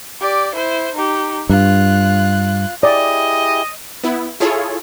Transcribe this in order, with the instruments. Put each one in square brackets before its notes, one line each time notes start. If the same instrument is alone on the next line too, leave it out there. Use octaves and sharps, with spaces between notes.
[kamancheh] G4 D5
E4 C5
D#4 G4
[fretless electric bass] G2 [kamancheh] F4 F#6
[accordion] E4 G4 G#4 [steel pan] D5 [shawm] D#5
[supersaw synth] B3 E4
E4 F4 G#4 A4 C#5